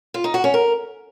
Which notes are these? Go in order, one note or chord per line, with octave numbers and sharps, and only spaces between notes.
F4
D#4
F#4
C#4
A#4